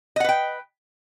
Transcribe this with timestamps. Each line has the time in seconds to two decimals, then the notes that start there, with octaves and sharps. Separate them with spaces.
0.16 D#5
0.20 F#5
0.24 B4
0.29 G5